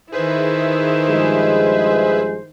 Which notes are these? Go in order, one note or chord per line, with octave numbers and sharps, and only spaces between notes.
D#3 E4 G#4 B4 C5 E5
G2 F3 G#3